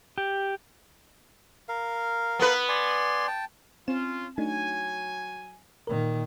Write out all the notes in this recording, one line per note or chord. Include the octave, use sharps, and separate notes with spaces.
G4
A#4 F5
B3 B4
D5 G#5 C6
G5 A5
C4 C#4 F4 E7
F#3 A3 D4 D#4 G#5
A#2 D#3 A#4